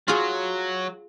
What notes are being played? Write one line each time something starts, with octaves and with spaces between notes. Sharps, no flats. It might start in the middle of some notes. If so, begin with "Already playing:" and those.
F#3 F4 G#4